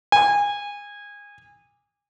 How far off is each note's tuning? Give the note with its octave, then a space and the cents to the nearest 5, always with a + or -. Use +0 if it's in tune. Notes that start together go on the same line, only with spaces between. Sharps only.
G#5 -25